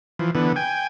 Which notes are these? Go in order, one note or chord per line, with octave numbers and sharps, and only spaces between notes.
E3 F3
D3 E3 B3
G5 G#5